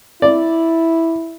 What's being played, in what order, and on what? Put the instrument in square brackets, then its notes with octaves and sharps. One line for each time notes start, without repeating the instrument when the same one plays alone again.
[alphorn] E4 [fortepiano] D5